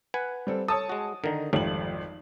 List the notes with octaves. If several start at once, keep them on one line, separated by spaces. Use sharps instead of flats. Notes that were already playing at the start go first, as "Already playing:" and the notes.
B4 F#5 G#5
G3 C4 A4
A4 C#5 A5 D#6
G#3 F#4
D3 D#3 A#4 D#5
G#1 F2 F3 G3 A3 F#7